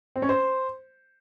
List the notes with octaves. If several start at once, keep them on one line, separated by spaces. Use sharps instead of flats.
C4
C#4
C5